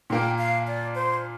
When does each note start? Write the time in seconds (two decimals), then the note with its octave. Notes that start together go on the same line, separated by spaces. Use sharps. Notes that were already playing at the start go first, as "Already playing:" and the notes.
0.10 A#2 A#3 D4 G5
0.38 F5
0.67 D5
0.95 C5